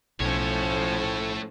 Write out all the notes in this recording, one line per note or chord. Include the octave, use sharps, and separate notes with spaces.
B1 A2 F3 A3 C#4 C5 C#5